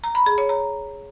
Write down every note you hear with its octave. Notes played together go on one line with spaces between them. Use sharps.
A#5
B5
G#4
C#5
A#5